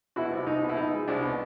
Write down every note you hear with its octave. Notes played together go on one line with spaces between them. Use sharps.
B2 E4 F#4
C2
C2 D#4
B2
E4
B2 D#4
G#3
C2 D4
B2